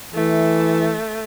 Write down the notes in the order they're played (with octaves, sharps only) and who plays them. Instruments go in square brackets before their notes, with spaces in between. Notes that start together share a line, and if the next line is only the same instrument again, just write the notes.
[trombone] E3 [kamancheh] A3